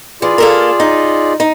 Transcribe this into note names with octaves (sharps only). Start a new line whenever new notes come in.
E3 F4 G#4 D5
A#3 A4 A#4
D#4
D#4